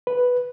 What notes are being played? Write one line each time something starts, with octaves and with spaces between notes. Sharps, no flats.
B4